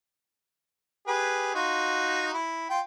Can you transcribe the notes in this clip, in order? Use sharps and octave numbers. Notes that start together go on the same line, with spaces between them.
G4 G#4 B4
D#4 F4 F#4
E4
F4 G5